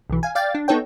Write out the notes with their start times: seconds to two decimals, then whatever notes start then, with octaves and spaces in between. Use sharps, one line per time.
0.10 B1 E3
0.23 F5 G#5
0.35 D5 F5 G5 A6
0.55 D4
0.68 B3 D#4 A4 C#5 G5